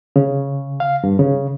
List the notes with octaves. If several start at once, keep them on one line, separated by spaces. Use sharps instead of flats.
C#3
F5
G2
C#3